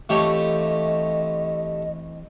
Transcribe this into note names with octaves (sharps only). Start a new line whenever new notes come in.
E3 A3 C4 F4 G4 C#5 D#5